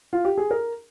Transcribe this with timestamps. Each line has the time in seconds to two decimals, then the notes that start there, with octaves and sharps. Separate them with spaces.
0.13 F4
0.25 G4
0.38 G#4
0.51 A#4